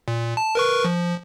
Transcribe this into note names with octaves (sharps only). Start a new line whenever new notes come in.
A#2
A5
A#4 B4 C#6
F3